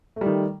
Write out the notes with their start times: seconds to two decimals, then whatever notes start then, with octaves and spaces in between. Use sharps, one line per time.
0.16 A3
0.21 G3
0.26 D#3